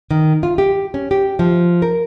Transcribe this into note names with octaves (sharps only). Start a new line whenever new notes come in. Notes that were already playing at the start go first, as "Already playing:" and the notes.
D#3
F4
G4
C#4
G4
F3
A#4